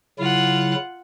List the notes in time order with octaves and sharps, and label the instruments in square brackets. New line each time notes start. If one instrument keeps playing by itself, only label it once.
[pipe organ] C#3 F#3 E4 [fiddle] F4 F#5